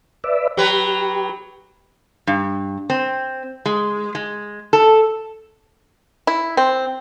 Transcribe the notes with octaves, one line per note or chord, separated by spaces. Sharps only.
B4 D5 E5
F#3 G4 B4
G2
C4
G#3
G#3
A4
E4
C4